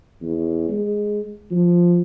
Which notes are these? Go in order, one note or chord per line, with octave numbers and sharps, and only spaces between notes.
E2
G#3
F3